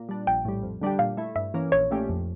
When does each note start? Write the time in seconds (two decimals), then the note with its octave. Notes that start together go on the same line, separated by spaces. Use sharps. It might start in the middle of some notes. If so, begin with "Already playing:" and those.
Already playing: A#2
0.09 G3 D4
0.27 A#1 G5
0.45 A2 G3
0.63 F2
0.81 D3 G3 D4 G4
0.99 A#2 F5
1.17 A3 E4
1.35 G2 E5
1.54 E3 A#3 C#4
1.72 A#1 C#5
1.91 A#2 A3 C#4 G4
2.09 F2